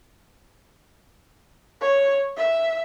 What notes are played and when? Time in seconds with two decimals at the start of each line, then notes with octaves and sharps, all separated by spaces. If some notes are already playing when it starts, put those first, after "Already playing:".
1.81 C#5
2.36 E5